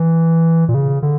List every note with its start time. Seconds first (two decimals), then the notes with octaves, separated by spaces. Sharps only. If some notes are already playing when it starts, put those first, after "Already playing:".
Already playing: E3
0.68 A#2
0.74 C#3
1.02 D3